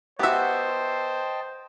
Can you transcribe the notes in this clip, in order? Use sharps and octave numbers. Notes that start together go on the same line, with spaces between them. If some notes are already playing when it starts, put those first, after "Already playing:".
B3 F#4 G4 C5 D#5 E5 G5 A5